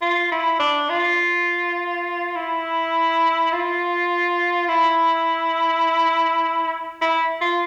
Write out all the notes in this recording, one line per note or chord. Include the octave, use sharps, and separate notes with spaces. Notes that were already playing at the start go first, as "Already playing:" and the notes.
F4
E4
D4
F4
E4
F4
E4
E4
F4